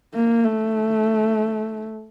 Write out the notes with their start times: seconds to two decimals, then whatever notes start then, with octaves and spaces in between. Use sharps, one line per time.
0.15 A#3
0.45 A3